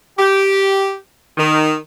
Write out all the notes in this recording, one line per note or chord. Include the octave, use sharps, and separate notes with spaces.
G4
D#3